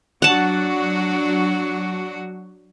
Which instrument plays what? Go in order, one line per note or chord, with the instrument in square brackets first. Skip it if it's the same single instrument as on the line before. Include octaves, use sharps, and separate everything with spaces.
[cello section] F#3 D4 F#4 [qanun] F#5 A5